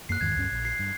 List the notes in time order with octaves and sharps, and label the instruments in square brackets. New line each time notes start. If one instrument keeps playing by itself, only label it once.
[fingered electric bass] F#2 A#3 [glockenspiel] F#6 C7
[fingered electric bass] E2 G#2 D#3 [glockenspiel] G#6
[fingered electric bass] D2 G2 C#4
A#1
[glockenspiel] C7
[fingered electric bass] G2